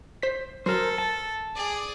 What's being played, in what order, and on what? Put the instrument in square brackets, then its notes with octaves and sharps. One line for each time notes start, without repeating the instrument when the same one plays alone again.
[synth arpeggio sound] C5 B6
[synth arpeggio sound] F#3 [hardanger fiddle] A4 [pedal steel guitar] A#4 C5
[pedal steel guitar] A5
[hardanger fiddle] G#4 D5